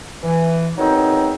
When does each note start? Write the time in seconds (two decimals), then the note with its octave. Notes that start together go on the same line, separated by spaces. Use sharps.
0.23 E3
0.78 E2 D#3 F#3 C4 D#4